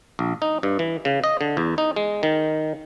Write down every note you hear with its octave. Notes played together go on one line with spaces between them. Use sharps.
A#1
D#4
G2
E3
C#3
D#5
D3
E2
D#4
G#3
D#3